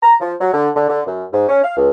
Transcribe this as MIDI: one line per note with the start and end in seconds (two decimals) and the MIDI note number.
0.03 0.14 82
0.20 0.34 53
0.40 0.51 54
0.53 0.69 50
0.75 0.84 50
0.89 1.00 50
1.06 1.24 42
1.33 1.45 44
1.48 1.63 61
1.64 1.72 77
1.77 1.90 37